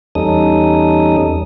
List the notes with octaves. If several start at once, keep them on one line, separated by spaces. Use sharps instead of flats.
E2 G3 C#4 D#4 A4 D#6